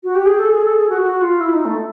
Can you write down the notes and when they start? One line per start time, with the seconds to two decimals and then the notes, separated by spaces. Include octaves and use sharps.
0.04 F#4
0.15 G4
0.26 G#4
0.39 A4
0.51 G#4
0.64 A4
0.77 G#4
0.89 F#4
1.02 F#4
1.21 F4
1.40 E4
1.53 D#4
1.65 A3